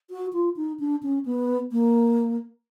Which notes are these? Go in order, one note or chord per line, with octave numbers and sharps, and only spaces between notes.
F#4
F4
D#4
D4
C#4
B3
A#3